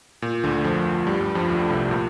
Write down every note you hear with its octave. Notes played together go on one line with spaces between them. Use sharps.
A#2
D2 D3
F2 F3
G2 G3
G2 G3
F2 F3
D2 D3
C2 C3
A#2